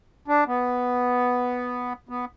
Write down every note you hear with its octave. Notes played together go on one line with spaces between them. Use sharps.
D4
B3
B3